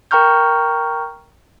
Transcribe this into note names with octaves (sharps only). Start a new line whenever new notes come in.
A#4 G5 A#5 C#6 F6 G6